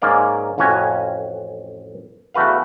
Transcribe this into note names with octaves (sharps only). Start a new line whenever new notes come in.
G#2 A#3 C#4 D5 F5
A1 F2 C#4 F#4 G#5
E2 A3 F#4 B4 F5